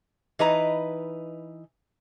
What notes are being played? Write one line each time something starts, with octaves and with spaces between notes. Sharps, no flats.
E3 D#4 B4 D#5 A#5